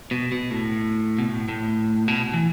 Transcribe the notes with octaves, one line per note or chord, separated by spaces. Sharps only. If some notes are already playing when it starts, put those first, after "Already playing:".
B2
B2
A2
B2
A2
A2
B2
E3